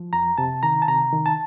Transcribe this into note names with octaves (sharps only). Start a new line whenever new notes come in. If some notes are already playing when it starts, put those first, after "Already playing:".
Already playing: F3
F2 A#5
C3 A5
D#3 A#5
A5
C3 A#5
D#3
A5